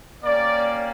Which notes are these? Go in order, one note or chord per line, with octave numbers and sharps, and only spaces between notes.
A#3 C#4 G4 D5